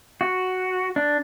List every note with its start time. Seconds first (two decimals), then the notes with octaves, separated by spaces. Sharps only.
0.21 F#4
0.96 D4